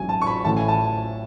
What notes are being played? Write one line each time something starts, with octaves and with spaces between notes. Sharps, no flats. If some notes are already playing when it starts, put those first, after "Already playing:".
Already playing: A1 G#2 F#3 G#5
A5
C#6
B5
A1 A2 E3 A3 A5
G#5
A5